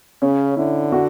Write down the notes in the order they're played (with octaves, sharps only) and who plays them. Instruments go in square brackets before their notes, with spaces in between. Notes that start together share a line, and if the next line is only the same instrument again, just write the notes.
[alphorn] C#3 [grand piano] C#4
[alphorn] D3 [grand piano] E4
[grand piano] F#4